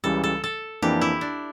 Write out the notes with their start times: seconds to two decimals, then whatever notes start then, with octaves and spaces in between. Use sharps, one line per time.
0.04 C#2 C#3 E3 G3 A4
0.24 A4
0.44 A4
0.82 F2 E3 A#3 D4 G4
1.01 E4
1.21 D4